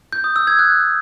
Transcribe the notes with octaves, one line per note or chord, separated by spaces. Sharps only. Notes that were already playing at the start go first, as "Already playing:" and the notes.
G6
D#6
E6
G#6
F#6